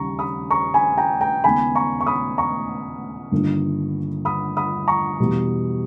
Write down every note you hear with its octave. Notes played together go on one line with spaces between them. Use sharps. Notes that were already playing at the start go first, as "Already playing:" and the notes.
Already playing: D#2 C#3 G3 A#5 C#6
B5 D#6
A#5 C#6
G#5 B5
G5 A#5
G5 A#5
D#2 C#3 G#3 B3 G#5 B5
A#5 C#6
C#6
B5 D#6
A#5 C#6
G1 G2 D#3 A#3
B5 D#6
B5 D#6
A#5 C#6
E2 B2 G3 B3